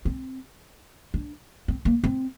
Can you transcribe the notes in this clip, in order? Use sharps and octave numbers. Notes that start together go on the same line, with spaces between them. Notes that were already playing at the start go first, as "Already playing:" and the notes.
C4
D4
C4
A#3
C4